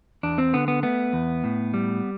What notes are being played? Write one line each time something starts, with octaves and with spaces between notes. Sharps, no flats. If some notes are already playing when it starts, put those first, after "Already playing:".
E2 D4
C4
D3 B3
B3
A3 B3
E2
A2
G3